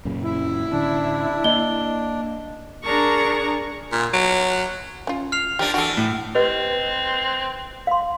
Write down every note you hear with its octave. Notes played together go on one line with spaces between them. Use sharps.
F#2 A#2 C#3
E4
A2 D3 C#4 D4
A#3 D#5 G7
D4 G#4 A#4 A#5 C#6
A#2
F#3
C#4 F4
F6 C7 F7
F3 A#3 D4 G4
E3 D4 F#4 A4
A2
C4 G4 B4 D#5
F5 C6